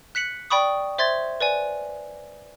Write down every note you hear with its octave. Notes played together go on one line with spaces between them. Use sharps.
F#6 B6 C#7 F#7
D5 G5 B5 C#6 D#6
C5 E5 C6 G#6 A6
B4 D5 G#5